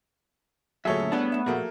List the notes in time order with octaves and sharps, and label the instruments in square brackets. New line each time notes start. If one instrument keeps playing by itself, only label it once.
[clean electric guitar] D2 A#2 E5 [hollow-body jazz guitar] F#3 [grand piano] G#4 A4 C#5
[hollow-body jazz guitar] F#2
[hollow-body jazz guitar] A2 G3 A5 [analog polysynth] B3 [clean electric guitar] D4
[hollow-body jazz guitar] A3 E5
[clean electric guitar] A#2 [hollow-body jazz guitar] F3 F#4 G#4 [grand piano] A3 A#3